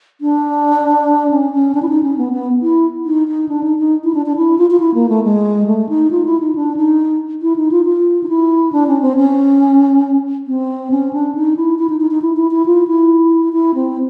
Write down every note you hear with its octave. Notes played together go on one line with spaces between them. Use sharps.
D4
C#4
C#4
D4
E4
D#4
C#4
B3
B3
E4
D#4
D#4
D4
D#4
D#4
E4
D4
D4
E4
F4
F4
E4
A#3
A3
G#3
A3
D#4
F4
E4
D#4
D4
D#4
E4
D#4
F4
F4
D#4
E4
D4
C#4
C4
C#4
C4
C#4
D4
D#4
E4
E4
D#4
D#4
D#4
E4
E4
E4
F4
E4
E4
C4